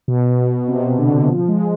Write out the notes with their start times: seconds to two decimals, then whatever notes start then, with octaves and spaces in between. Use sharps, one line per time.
0.08 B2
0.68 C3
0.98 D3
1.27 F3
1.48 G#3